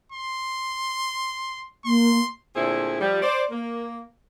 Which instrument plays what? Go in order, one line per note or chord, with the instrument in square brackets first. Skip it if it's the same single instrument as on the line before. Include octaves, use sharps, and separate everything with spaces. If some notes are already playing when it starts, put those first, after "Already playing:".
[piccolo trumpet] C6
[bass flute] A#3 [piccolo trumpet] C6
[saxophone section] A#2 D3 A3 C4 E4 G#4
F3 G3
C5 D5
A#3